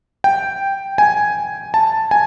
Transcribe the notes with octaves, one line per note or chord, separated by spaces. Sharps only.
G5
G#5
A5
G#5